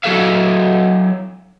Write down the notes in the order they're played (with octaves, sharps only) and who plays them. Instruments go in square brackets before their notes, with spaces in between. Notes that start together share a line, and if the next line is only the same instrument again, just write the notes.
[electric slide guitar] F#3 F#4 A4 E5 F5